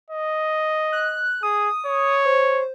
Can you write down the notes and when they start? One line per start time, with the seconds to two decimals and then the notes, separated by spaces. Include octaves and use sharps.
0.10 D#5
0.92 F#6
1.43 G#4 D#6
1.86 C#5
2.26 C5